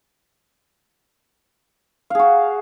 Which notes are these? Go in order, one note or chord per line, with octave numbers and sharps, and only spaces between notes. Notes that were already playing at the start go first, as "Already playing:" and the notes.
F#4 G#4 F5